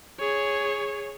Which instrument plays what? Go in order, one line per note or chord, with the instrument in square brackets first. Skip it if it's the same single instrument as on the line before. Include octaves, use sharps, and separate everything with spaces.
[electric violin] G#4 C#5